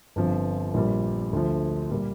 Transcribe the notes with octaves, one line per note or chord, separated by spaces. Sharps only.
G1 G2 F3 C4 F4
A#1 A#2 G3
D2 D3 F3
A#2 G3 A#3